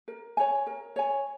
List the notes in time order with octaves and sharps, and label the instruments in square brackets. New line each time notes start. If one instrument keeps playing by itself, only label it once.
[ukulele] A#4
C#5 G#5
A#4
C#5 G#5